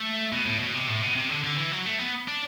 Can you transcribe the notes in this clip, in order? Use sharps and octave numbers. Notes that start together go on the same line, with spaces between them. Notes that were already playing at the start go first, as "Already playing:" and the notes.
Already playing: A3
B2
A2
B2
C3
A2
B2
C3
D3
D3
E3
F#3
A3
B3
D4